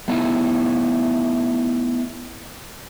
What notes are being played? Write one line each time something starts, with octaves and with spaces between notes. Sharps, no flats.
A3 B3 D#4 E4 A4